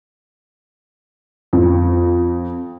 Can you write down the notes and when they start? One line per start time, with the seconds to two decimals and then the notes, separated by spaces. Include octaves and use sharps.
1.53 F2